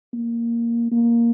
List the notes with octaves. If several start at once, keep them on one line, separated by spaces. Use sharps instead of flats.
A#3
A#3